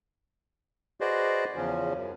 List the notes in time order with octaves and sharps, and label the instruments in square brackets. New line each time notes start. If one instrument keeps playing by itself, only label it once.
[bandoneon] F#4 G#4 B4 C5 D5 D#5
E2 C#3 F3 C#4
F#2